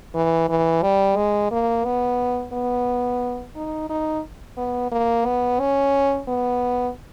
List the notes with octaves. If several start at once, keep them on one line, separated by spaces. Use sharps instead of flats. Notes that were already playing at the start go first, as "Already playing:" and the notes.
E3
E3
G3
G#3
A#3
B3
B3
D#4
D#4
B3
A#3
B3
C#4
B3